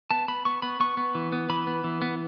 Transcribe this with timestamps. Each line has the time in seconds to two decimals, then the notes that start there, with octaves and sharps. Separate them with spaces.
0.11 B3 A5
0.28 B3 B5
0.45 B3 C#6
0.62 B3 B5
0.80 B3 C#6
0.97 B3
1.15 E3
1.32 B3
1.49 E3 B5
1.67 B3
1.84 E3
2.02 B3